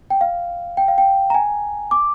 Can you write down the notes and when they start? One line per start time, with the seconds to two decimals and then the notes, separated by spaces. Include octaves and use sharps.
0.10 G5
0.21 F5
0.77 G5
0.88 F5
0.98 G5
1.30 A#5
1.34 G#5
1.91 D6